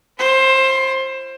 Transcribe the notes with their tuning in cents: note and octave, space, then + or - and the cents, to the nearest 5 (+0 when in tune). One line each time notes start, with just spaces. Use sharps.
F4 -40 C5 +20